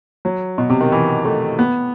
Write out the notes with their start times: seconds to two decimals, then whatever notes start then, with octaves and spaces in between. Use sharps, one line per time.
0.25 F#3
0.58 B2
0.70 C3
0.81 D#3
0.92 E3
1.25 A3
1.59 B3